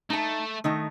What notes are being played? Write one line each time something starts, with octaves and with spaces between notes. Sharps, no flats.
A3 D#4 A5
D#3 A3 D#4